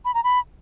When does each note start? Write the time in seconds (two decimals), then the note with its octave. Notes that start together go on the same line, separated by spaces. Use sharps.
0.05 B5
0.14 A#5
0.24 B5